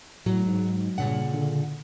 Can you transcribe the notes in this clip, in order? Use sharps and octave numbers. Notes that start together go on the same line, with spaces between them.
A2 F#3
G#2
G2 A#2 C#3 F#5
D3